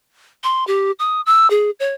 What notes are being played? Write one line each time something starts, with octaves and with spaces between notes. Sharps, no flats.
C6
G4
D#6
E6
G#4
C#5